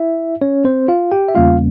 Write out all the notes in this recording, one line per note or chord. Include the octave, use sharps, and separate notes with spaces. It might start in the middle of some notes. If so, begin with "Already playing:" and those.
Already playing: E4 E5
C#4 C#5
C4 C5
F4 F5
G4 G5
E5
E2 C#3 G3 A#3 C#4 F4 F5